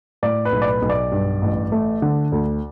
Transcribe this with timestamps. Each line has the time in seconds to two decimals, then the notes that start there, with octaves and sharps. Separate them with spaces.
0.23 A2 D5
0.45 B4
0.52 B1
0.62 D5
0.68 B4
0.82 B1
0.90 D5
1.12 G2
1.42 A1
1.72 A3
2.02 D3
2.32 D2